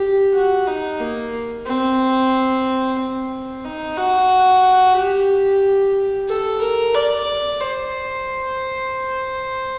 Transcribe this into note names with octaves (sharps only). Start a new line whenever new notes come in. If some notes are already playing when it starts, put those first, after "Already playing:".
Already playing: G4
F#4
D#4
A#3
C4
C4
D#4
F#4
G4
A4
A#4
D5
C5